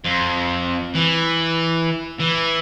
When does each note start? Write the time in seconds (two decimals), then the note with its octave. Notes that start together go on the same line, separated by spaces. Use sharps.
0.05 F2
0.95 E3
2.20 E3